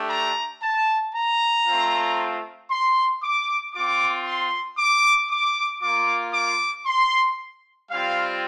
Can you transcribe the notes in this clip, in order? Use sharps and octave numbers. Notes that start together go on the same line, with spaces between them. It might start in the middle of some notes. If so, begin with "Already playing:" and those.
Already playing: A3 D4 G4
A#5
A5
A#5
A3 C4 F4
C6
D6
C4 F4 D6
C6
D6
D6
A#3 F4 D6
D6
C6
G3 C4 F4 F5